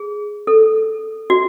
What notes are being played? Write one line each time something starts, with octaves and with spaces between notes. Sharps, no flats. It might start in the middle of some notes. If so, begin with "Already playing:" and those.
Already playing: G#4
A4
F#4